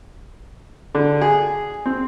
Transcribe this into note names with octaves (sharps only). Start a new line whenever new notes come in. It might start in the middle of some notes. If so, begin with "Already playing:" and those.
D3
G#4
C4